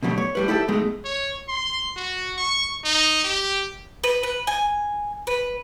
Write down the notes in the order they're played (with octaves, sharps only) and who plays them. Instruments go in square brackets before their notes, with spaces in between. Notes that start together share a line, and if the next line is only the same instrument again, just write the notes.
[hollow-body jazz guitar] B2 D3 F#3 G3 A3
C#5
A2 G3 B4
E4 G4 A4 D#5 E5
G#2 B2 F#3 G#3 A3
[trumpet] C#5
C6
F#4
C#6
D#4
G4
[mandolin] B4
B4
G#5
B4